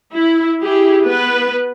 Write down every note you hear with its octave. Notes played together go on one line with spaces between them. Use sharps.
E4
E4 G4 G#4
B3 B4